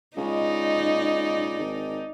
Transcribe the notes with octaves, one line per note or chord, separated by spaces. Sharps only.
C#2 D#4 D5
G#1